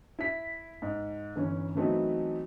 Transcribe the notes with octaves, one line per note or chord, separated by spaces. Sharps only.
E4 B6
G#2
G1 E3 C#4
E3 F#3 A3 B3 C4 D#4